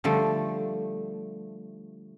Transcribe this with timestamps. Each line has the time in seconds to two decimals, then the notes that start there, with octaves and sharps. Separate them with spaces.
0.04 D3 F3 G3 A3